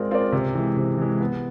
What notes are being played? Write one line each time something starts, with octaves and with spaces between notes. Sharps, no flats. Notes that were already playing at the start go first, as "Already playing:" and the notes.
Already playing: G#3 C4 F4 A#4 D5
C4 F4 A#4 D5
C3
E3 G#3
C3
E3 G#3
B3